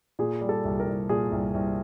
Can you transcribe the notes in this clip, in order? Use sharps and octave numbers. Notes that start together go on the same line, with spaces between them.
A#2 G#4
G3
A4
C2
A#4
C2
A#2 G#4
C2
C2